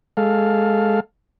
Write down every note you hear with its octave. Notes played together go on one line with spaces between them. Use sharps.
G#3 A4 F5